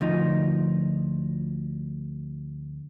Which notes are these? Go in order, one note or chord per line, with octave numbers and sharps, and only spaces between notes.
D2 F3 D#4